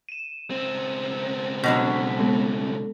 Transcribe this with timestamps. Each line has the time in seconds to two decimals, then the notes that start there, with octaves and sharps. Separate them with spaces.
0.09 D#7 E7
0.50 C#2 C4
1.64 B2 D3 F#3 B6
2.19 G#3 B3 A4